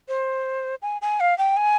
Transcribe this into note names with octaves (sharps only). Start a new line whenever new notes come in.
C5
G#5
G#5
F5
G5
G#5